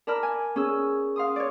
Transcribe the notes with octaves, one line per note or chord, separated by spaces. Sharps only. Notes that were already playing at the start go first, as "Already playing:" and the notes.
A#4 D5 A5 B5 F6
G#5
C#4 G#4 E6
F5 C6 D#6
C#5 D5